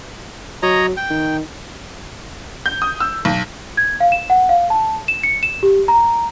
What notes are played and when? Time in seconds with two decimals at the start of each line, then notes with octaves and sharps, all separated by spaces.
0.63 F#3 C#5 D#5 A#5
0.97 G5
1.10 D#3
2.66 G6
2.82 D#6
3.00 E6
3.25 B1
3.77 G#6
4.00 F5
4.12 E7
4.30 F#5
4.49 F5
4.70 A5
5.08 E7
5.23 C#7
5.43 E7
5.63 G4
5.88 A#5